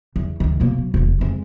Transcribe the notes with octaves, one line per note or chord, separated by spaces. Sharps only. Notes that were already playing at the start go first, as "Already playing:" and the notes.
E2
D2 D#3
B2 A#3
F#3
E1 E2
F2 G#3